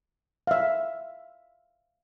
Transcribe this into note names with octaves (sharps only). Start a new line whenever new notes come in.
E5 F5